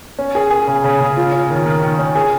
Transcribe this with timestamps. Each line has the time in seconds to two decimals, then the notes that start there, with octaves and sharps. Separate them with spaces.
0.19 C#4
0.35 G#4
0.50 G#4
0.67 C#3
0.84 C#3
1.00 C#3
1.17 F4
1.32 C#4
1.50 D#3
1.66 D#3
1.82 D#3
1.99 C#4
2.15 G#4